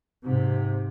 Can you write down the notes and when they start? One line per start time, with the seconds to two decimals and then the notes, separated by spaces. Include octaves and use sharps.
0.25 G#2 C3